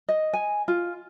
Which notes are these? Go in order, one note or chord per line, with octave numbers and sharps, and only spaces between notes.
D#5
G#5
F4